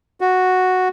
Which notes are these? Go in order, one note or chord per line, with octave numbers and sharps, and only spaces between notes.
F#4